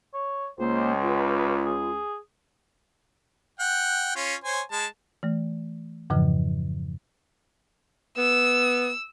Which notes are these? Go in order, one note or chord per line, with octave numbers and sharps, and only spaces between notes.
C#5
C#2 A#3 C5
F4 B4
G#4
F#5 G5
C#4 F4
C5 C#5 G#5
G#3 A5
E3 A3
F2 G#2 C#3 E3 F3
B3 E6